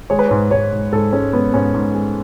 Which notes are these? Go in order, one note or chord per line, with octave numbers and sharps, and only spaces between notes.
G#3 C#5
B4
G#2 C#5
G#2 C#5
G#2
G#2 A4
G#3 C#4
G#2 B3
G#2 C#4
G#2
G#3